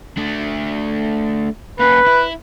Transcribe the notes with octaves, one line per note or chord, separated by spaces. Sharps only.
A3 D4
A#3 C#4 B4
E4